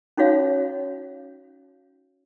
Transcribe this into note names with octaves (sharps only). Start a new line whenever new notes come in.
C#4 D#4 F#4 C#5 F5